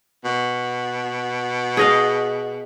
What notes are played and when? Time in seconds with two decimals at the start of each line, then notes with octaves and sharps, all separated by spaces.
0.25 B2
1.77 G#4 D#5 F5